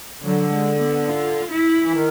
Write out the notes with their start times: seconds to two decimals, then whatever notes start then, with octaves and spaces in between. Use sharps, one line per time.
0.22 D3 F#3
0.52 G#3
0.80 B3
1.08 F4
1.51 E4
1.83 E3
1.94 D#3